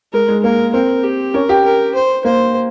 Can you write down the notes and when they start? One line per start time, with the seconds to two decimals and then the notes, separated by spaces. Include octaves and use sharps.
0.13 G#3 A#4
0.28 G#3
0.43 A#3 A#4
0.74 C4 A#4
1.03 G4
1.34 C#4 A#4
1.49 G4
1.65 A#4
1.95 C5
2.25 A#3 C5